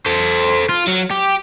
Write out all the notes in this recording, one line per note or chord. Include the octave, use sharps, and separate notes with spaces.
A4 C5
F4
F#3
G4